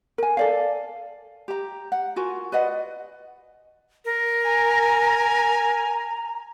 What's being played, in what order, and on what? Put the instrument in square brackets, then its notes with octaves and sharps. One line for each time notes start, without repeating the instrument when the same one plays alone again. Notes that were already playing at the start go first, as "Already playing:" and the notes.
[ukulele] A#4 G#5
A4 D5 F5
G4 A#5
F#5
F4 F#4 A#4 G#5
B4 D5 D#5 F#5
[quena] A#4
[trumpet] G#5 [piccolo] A#5